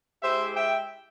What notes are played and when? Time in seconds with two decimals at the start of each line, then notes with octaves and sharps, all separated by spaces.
0.23 G#3 E4 G4 C5 E5
0.56 E5 G5